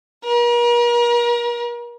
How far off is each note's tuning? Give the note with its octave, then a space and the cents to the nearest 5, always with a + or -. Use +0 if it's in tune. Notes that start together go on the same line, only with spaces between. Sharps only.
A#4 +40